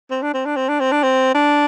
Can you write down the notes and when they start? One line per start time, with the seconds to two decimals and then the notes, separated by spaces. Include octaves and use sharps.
0.10 C4
0.22 D4
0.34 C4
0.45 D4
0.56 C4
0.69 D4
0.80 C4
0.92 D4
1.03 C4
1.35 D4